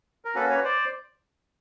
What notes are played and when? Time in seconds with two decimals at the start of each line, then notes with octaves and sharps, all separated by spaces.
0.25 A#4
0.35 A#3 C#4 F#4 A4 B4
0.50 B4 C#5
0.64 C5 D5